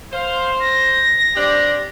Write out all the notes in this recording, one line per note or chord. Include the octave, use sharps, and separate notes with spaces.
C5 F5
A#6
C4 D4 G4